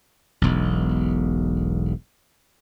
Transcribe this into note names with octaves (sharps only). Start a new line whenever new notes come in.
E1 B1